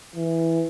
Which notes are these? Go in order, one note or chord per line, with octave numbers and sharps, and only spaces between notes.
E3